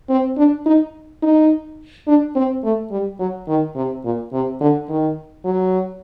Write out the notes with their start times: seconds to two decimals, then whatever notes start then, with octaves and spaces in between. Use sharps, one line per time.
0.09 C4
0.37 D4
0.66 D#4
1.22 D#4
2.07 D4
2.35 C4
2.64 A3
2.91 G3
3.20 F#3
3.48 D#3
3.76 C3
4.05 A#2
4.33 C3
4.61 D3
4.89 D#3
5.45 F#3